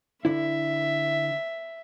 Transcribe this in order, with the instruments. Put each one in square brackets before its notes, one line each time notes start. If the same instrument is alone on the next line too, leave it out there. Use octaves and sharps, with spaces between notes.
[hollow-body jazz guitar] D3 E4 [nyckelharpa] E5